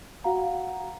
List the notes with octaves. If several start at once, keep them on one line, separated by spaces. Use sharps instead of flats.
F#4 F5 F#5 A#5